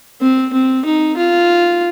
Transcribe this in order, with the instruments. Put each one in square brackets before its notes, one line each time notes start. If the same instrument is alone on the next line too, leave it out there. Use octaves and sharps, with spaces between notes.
[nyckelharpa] C4
C4
D#4
F4